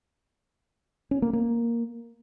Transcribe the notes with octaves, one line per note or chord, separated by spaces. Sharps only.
C#4
A#3
A#3